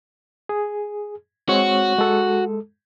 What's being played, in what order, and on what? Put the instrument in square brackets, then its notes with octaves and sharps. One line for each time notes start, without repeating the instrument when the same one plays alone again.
[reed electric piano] G#4
[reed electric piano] G#3 C4 C#5 [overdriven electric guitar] F#4
[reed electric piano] G#3 A4